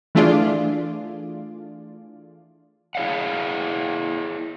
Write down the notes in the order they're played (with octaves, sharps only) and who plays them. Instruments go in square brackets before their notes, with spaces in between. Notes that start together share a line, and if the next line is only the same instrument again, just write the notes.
[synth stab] E3 A3 D4 F4 G#4 D5
[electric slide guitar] E4 G#4 C#5 F5 F#5